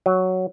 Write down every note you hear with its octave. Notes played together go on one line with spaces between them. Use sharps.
F#3